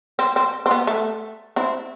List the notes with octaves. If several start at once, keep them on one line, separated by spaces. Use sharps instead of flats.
C4
C4
C4
B3
A3
C4 E4